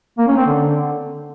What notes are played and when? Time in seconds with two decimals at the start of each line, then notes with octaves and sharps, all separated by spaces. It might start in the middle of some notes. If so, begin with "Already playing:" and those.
0.18 A#3
0.28 C#4
0.37 C4
0.46 D3